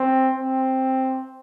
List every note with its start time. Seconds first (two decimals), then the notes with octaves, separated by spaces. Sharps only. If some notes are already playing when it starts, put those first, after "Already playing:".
Already playing: C4
0.34 C4